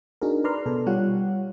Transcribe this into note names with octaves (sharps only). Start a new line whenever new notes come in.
D4 D#4 F#4 G#4 A#4
B4 D5 A#5 C6 F6
B2 A4
G3 F4 G4 C#5 F#5